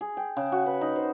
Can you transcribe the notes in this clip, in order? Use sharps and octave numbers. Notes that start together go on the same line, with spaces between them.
G#4
G5
C#3
F#4
B4
D#4
C5